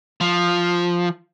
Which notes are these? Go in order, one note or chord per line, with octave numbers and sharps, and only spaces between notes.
F3